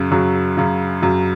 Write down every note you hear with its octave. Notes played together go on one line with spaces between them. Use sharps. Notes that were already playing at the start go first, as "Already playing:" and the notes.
Already playing: F#2 C#3 F#3
F#2 C#3 F#3
F#2 C#3 F#3
F#2 C#3 F#3